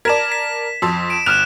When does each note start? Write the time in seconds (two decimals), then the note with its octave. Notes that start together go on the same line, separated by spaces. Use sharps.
0.05 A#4 D5 A5 G#6 B6 E7
0.32 B6
0.82 F2 A5 C6 E6
1.10 D7 E7
1.26 G1 F6 F#6 E7 F7